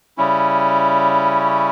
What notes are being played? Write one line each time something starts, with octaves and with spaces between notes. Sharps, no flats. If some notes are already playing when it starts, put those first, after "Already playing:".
C#3 G3 C#4 E4